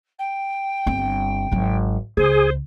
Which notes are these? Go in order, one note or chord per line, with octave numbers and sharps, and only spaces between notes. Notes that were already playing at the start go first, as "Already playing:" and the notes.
G5
G1 C4
G#1 F#3
C#2 G#4 C5